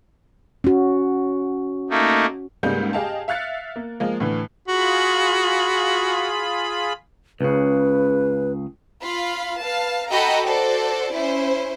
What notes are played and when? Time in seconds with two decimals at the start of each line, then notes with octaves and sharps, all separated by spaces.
0.64 C#4 F#4
1.90 A3 A#3 D#4
2.63 C#2 G#2 G3 G#3 A#3 G6
2.93 G4 G#4 D#5 F5 G5 A5
3.28 E5 F5 F#6 A6 C#7
3.76 A#3
4.00 F3 G#3 A#3
4.20 A2 D3 E3
4.68 F4 F#4 G#4 B5
7.41 C#2 C#3 B4
9.03 F4 F5 B5
9.62 B4 F5 A5
10.10 F#4 A4 D#5 G5 A#5 B5
10.46 F#4 A4 C5 D5
11.13 C#4 E4 C5